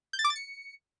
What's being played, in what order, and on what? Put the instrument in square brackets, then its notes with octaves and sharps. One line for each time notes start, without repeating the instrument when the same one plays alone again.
[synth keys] G6
A6
D6
A6
C#7